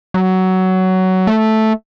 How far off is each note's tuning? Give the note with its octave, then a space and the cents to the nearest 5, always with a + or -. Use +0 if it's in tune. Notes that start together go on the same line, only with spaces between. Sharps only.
F#3 +15
A3 -5